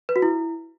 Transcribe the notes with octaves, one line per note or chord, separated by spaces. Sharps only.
B4
F#4
E4